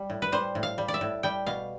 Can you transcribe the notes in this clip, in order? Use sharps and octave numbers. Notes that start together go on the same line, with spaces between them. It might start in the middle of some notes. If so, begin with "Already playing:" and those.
Already playing: G3
A2
B4
G3 C5
A2
F5
G3
D5
E5
A2
G3 G5
B2 F5